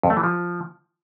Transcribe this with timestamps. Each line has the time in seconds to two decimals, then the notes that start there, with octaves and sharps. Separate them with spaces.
0.03 F2
0.10 A3
0.17 E3
0.24 F3